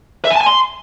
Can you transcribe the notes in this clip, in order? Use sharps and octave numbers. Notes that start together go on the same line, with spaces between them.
E5
G#5
A5
G#5
C6